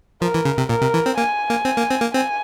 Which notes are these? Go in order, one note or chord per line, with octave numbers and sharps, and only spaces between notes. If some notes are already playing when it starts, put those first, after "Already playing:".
F3 A#4
E3
C#3
C3
A#2 A#4
C3
E3
C4
A#3 G#5
A#3
C4
A#3
C4
A#3
C4 G#5